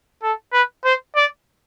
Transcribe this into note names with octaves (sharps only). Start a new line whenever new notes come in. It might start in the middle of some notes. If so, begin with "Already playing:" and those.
A4
B4
C5
D5